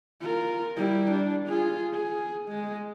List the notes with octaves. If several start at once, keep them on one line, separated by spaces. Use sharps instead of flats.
F4 A#4
G3 E4
D4
F4 G#4
G#4
G#3